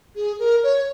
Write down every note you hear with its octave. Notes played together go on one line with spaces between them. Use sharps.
G#4
A#4
C#5